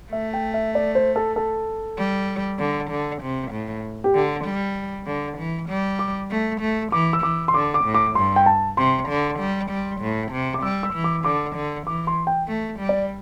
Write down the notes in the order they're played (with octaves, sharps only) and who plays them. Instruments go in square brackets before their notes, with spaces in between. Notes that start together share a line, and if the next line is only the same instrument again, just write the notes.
[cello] A3 [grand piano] E5
[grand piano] G5
E5
D5
C5
A4
A4
[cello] G3
D3
D3
C3
A2
[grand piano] G4
[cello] D3
G3
D3
E3
G3
[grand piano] D6
[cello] A3
A3
[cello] E3 [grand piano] D6
[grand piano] E6
[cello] E3 [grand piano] D6
[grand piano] C6
[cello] D3 [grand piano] D6
[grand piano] D6
[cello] A2
[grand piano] D6
[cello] G2 [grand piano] C6
[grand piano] G5
A5
[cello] C3 [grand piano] C6
[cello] D3
G3
G3
A2
C3
[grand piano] D6
[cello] G3 [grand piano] E6
[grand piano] E6
[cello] E3
[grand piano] D6
[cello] D3 [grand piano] D6
[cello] D3
[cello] E3 [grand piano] D6
[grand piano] C6
G5
[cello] A3
G3
[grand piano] D5